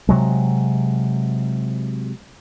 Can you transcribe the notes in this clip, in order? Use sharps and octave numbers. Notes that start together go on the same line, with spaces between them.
C3 F#3 G#3